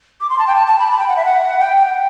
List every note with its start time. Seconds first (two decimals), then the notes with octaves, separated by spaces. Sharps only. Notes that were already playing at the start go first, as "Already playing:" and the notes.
0.21 D6
0.30 C6
0.39 A5
0.47 G5
0.56 A5
0.67 A5
0.79 B5
0.86 A5
0.91 B5
0.99 G5
1.08 F#5
1.16 E5
1.25 F#5
1.60 G5
1.77 G5